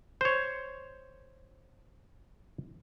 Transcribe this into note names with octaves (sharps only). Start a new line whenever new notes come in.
C5 C#5